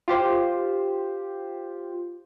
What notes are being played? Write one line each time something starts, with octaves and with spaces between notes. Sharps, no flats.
F4 G4 C5